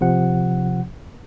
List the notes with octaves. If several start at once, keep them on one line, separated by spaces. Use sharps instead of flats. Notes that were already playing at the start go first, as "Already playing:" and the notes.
C3 F3 F#5